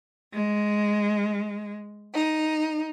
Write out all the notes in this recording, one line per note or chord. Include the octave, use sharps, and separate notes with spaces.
G#3
D#4